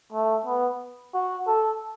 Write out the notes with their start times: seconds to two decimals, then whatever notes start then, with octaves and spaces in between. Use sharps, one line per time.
0.12 A3
0.46 B3
1.14 F#4
1.47 A4